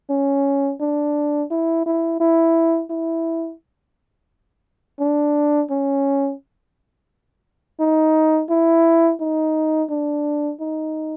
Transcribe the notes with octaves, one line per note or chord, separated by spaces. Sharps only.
C#4
D4
E4
E4
E4
E4
D4
C#4
D#4
E4
D#4
D4
D#4